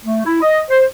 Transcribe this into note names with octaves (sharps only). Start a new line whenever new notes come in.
A3
E4
D#5
C5